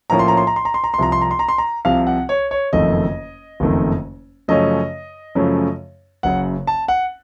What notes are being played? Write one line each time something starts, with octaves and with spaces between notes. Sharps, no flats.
A2 F3 A#3 C#4 A#5
C6
A#5
C6
A#5
C6
A#5
C6
A#5
C6
C2 C3 F3 A#5
C6
A#5
C6
A#5
C6
A#5
C2 C3 F3 F5
F#5
C#5
C#5
F#1 F2 D#3 A3 D#5
F#1 F2 D#3 A3
F#2 C#3 F3 A3 C#4 D#5
F#2 C#3 F3 A3 C#4
F#1 F#2 C#3 F#5
A5
F#5